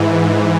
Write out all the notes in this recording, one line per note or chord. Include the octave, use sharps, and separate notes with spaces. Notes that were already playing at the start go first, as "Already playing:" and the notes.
Already playing: G#2 E3